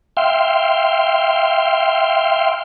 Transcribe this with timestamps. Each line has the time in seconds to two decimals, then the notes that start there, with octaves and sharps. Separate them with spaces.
0.17 E5 F5 G5 C6